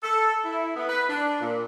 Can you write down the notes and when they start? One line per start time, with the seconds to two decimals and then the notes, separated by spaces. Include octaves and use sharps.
0.03 A4
0.45 E4
0.76 B3
0.89 B4
1.09 D4
1.41 A#2